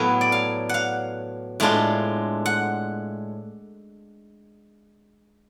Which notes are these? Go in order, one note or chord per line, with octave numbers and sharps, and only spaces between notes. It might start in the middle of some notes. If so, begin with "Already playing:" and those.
Already playing: A2 F#3 B3 A4 B4 F5
D5
F5
F5 F#5
A2 G#3 D4 F4
F#5